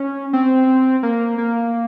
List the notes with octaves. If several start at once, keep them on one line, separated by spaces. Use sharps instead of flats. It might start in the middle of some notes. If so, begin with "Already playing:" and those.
Already playing: C#4
C4
A#3
A#3